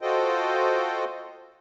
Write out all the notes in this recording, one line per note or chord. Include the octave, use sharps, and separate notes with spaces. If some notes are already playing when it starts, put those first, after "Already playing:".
F4 F#4 A4 C5 D#5 G5